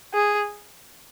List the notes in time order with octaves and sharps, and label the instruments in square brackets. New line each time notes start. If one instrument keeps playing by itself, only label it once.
[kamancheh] G#4